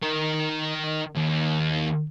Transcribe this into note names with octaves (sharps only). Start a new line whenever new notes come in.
D#3 A#4
D#2